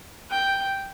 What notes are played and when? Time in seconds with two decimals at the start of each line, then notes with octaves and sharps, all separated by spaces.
0.30 G5